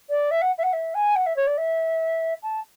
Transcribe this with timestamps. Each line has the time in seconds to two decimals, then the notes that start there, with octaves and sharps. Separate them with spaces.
0.10 D5
0.31 E5
0.41 F#5
0.58 E5
0.63 F#5
0.73 E5
0.94 G#5
1.15 F#5
1.26 E5
1.36 C#5
1.47 D5
1.57 E5
2.43 A5